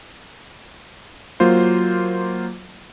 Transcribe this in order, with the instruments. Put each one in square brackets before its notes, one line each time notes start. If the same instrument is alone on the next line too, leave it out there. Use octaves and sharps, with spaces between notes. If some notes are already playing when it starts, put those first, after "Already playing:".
[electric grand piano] F#3 A#3 F4 C5